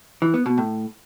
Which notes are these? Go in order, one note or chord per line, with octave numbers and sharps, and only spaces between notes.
E3
B3
B2
A2